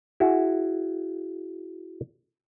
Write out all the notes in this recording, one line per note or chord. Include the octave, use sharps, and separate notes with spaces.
E4 F#4 G#4